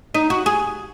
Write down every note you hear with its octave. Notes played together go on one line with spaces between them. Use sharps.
D#4
F#4
G#4